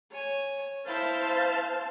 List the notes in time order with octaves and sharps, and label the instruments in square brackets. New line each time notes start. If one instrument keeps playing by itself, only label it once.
[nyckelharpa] C#5 G#5
[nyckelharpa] E4 [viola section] C5 F5 A5